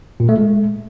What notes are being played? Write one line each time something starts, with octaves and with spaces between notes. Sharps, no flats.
A#2
A3
G#3